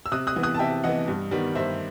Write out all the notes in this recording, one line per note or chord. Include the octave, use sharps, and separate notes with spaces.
E6
C3 D#6 F#6
D#6 F#6
E3 B3
D#6 F#6
A5
C3 E5 G5
E3 B3 D#5 F#5
G2
D#3 G3 B3
G2 C5 E5